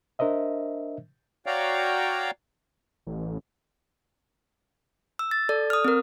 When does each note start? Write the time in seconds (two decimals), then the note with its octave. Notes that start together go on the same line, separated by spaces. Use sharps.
0.19 D4 A#4 C5 D#5 E5
1.46 F#4 C#5 D5 F5 G5 A#5
3.07 A1
5.19 E6
5.31 A6
5.49 A4 D5
5.70 D#6 F6
5.84 C4 A#4